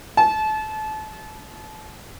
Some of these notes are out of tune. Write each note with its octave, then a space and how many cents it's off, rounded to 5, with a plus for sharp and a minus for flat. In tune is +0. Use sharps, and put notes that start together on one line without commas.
A5 -30